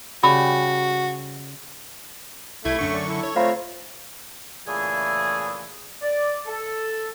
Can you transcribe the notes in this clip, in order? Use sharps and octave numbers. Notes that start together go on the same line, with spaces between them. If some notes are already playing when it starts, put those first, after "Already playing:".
C#3 G3 F#4 G#5 B5
C2 A3 E4 G#6
F#2 D3 C#6
D5
E4 A4
C#5
A3 C4 F4 C5 F5 A#5 B5
A#2 C#3 E3 A3 E4 G#4
D5
A4